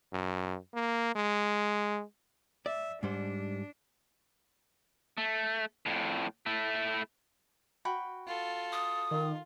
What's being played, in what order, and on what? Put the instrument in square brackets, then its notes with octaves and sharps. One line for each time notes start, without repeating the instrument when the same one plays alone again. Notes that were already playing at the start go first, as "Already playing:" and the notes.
[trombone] F#2
A#3
G#3
[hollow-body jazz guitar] D5 [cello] E5
[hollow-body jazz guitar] G#2 G3 C5 [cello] D4
[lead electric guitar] A3
F2 A2
A3 E4
[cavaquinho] F#4 G5 B5
[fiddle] F4 A4
[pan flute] D#6
[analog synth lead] D#3 [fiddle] F4